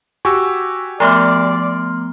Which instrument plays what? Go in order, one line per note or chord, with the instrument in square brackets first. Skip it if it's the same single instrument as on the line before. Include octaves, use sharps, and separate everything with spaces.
[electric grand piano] F#4 G4 G#5 [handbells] C#6 E6
[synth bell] F3 A3 B3 [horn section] D5 [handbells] A#5 C6 F6